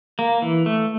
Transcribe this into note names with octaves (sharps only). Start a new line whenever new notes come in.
A#3
E3
A3